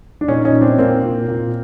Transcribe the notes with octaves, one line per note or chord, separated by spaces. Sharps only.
D4
A#2 C#4 D#4
C#4 D#4
A#2
C4 D4
A#2 A#3 C4
A#2
A#2